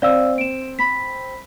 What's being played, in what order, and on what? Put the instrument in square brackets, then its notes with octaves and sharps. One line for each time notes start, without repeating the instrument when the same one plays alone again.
[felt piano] C4 [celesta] D5 F5 E6
[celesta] D7 E7
B5 B6